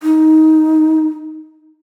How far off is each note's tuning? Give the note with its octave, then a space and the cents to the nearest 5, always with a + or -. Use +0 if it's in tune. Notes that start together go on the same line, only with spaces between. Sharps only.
D#4 +15